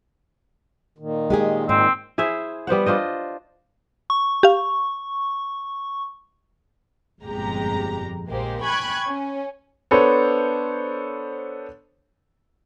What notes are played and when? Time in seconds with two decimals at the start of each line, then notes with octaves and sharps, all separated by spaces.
0.98 A#2 D#3
1.30 G#3 G4 G#4
1.69 G#2 C4
2.18 E4 G#4 C5 E5
2.67 G3 B3 C5 F#5
2.86 D4 F4 C5 D#5
4.10 C#6
4.43 G4 F5
7.22 G1 F2 A#2 G#3 G4 A#5
8.29 A#1 G#3 A#3 G4 C5
8.63 G5 G#5 B5 C#6 F#6 G#6
9.09 C#4
9.91 B3 D4 A4 C5 C#5